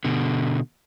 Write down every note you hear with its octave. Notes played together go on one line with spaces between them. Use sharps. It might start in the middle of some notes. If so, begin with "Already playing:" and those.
B2 D3